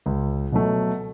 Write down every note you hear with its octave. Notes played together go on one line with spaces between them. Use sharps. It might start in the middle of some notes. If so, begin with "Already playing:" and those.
C#2
B2 F#3 A3